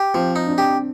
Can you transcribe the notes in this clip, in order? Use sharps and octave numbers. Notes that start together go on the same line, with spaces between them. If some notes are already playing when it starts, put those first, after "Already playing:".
Already playing: G4
F3 C4
D#4
D4
G4